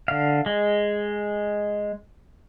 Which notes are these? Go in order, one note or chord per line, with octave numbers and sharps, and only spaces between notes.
D3 F5
G#3